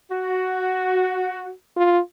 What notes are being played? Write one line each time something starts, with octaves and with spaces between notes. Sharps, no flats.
F#4
F4